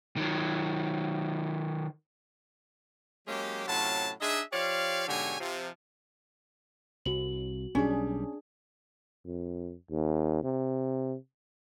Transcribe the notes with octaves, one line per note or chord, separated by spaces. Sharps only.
D#3 F#3
F#3 G#3 A#3 C#4 G4
A2 C3 F#3 C#4 F4 A5
D4 D#4 G#4 D#5 E5
F3 G4 C#5 D5 F5
G#2 B2 D3 G4 C#5 G#5
C3 F3
C2 F#4 F#7
B1 G3 C#4 D4 G#4
F2
D#2
C3